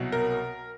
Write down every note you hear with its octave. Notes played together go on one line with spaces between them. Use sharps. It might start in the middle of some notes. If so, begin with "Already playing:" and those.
Already playing: C2 B2 F#3
A#4